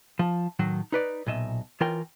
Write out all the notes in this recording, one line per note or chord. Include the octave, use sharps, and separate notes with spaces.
F3
A2 D#3 F#3
D#4 B4 D5
B1 A#2 D#5 E5
E3 F4 A#4 C#5 G5